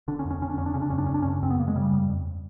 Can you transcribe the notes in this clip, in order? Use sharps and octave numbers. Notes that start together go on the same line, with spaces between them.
D3 D4
C#4
F2
C#4
D3 C#4
D4
F2 C#4
D4
C#3 C#4
D4
F#2 C#4
D4
C#4
F#2
D4
C#4
C#3
F#2 C4
B3
F#2 A#3
G#3
C#3 G3
F#2
F2